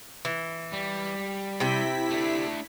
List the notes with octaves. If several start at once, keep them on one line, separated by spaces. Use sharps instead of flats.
E3
G3
C3 E4 G5 B6
A3 D4